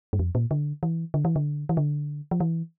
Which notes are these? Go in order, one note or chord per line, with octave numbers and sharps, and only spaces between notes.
G2
F2
A#2
D3
E3
D3
E3
D3
E3
D3
F3
E3